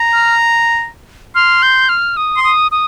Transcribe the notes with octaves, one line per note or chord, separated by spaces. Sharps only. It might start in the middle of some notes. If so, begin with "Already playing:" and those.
Already playing: A#5
F6
C6 F6
G6
F6
D#6
C6
D#6
D#6